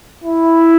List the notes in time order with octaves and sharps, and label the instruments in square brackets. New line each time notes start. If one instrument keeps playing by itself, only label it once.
[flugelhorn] E4